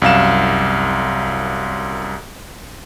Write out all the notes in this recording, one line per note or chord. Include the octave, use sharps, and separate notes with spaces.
C2 F#2 F5 E7